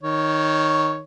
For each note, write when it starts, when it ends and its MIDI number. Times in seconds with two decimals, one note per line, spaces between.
0.03 1.01 51
0.03 1.01 73